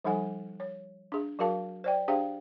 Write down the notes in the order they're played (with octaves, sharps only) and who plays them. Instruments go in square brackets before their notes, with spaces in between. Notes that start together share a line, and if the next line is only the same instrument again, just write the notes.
[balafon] F3 G3 D#4 A4 F#5 G#5
C#5
D4 G#4
F#3 F#4 G#4 A#4 F5 A5
C5 D5 G5
D4 G4 G#4 C5 F5 G5